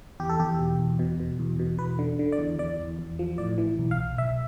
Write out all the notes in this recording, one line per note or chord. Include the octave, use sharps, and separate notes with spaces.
E2 G4
A4
E2 G4
B2
E2
B2
B2
E2
B2
E2 B4
D3
D3
D5
E2
E2 D5
E2
E2
F3
A2 D5
E3
B1
F5
B1
B1 E5